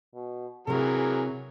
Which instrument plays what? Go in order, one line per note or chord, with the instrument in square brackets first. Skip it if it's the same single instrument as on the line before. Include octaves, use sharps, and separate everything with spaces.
[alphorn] B2
[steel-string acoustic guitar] C3 A#5 [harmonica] E3 F#3 A#4 [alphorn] G#4